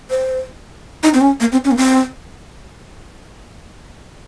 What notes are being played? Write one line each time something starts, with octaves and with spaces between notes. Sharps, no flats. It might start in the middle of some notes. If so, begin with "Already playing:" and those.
C5
D#4
C4
C#4
A#3
C4
C#4
A#3
C4